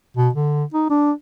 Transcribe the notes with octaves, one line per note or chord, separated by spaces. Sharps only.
B2
D3
D#4
D4